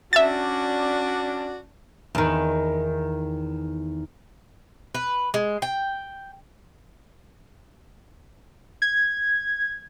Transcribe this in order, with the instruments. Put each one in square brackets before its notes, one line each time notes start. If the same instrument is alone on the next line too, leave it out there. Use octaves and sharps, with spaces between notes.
[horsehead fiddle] C#4 D4 [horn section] F#4 D5 [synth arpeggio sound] E5 A6
[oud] E2 D#3
[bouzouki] B4
G#3
G5
[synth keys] G#6